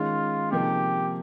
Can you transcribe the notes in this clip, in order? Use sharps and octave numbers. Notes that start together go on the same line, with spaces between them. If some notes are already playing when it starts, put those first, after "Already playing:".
Already playing: D#3 G#3 C#4 F4
C3 F3 A#3 D#4 G4 G#4